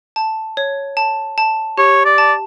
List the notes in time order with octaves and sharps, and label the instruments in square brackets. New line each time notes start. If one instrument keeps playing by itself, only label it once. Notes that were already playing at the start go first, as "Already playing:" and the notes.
[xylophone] A5
C#5
A5
A5
[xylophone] G4 [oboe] C#5
[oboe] D5
[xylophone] A5